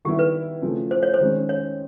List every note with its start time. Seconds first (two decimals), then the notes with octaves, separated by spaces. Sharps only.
0.05 D#3 G3 B3 E4 G4
0.19 B4
0.62 C#3 F3 A3
0.91 C5
1.03 C#5
1.14 C5
1.20 D#3 G#3 C#4
1.49 C#5